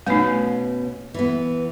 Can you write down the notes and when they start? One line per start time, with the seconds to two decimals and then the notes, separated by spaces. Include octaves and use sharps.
0.06 B2 A3 B3 C#4 D#4
1.14 E3 B3